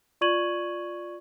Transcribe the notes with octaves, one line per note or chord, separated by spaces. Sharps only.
F4 D5 C#6 G#6 D#7 F#7